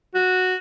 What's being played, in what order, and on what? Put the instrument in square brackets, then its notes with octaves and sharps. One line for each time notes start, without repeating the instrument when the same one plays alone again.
[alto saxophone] F#4